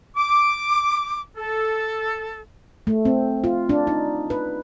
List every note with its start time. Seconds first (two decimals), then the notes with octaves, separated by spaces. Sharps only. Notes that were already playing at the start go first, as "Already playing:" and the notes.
0.16 D6
1.36 A4
2.87 A3
3.05 C4
3.44 F4
3.69 D4
3.87 D#4
4.30 B4